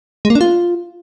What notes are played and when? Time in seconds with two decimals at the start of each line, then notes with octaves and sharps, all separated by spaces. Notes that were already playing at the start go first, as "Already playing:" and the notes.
0.25 G#3
0.30 A#3
0.35 D4
0.41 F4